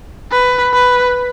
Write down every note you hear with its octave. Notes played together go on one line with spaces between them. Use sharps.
B4
B4